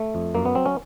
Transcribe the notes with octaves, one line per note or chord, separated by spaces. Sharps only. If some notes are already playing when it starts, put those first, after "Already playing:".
Already playing: A3
F2
F#2 A#3
B3
F#3 C4
C#4